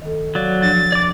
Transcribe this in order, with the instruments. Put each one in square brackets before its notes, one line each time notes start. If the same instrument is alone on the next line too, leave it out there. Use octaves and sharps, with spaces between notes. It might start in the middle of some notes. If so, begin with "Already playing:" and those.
[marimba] D#3 A4
[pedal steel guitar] F#3 D5 [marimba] F5
[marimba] F3 D4 [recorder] A6
[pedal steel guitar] D5 D6